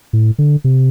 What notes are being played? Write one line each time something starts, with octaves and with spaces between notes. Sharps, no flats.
A2
D3
C3